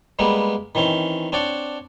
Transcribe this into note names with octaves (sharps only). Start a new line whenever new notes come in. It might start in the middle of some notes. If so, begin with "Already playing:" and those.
G3 G#3 A#3 B3
D#3 E3 C4 C#4
C4 D4 C#5 D5 F#5